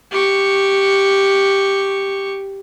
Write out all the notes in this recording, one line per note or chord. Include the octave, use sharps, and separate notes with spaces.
G4 C#6